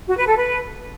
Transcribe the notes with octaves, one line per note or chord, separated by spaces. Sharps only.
F#4
B4
A4
B4